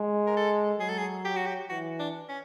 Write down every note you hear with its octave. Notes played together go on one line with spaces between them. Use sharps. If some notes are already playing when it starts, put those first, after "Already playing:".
Already playing: G#3
A#4
A4
F#3 G#4
A4
G#4
G4
F#4
G4
E3 F#4
D4
C#4